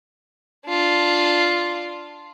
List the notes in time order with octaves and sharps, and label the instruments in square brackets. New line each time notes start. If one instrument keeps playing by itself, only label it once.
[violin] D4 F4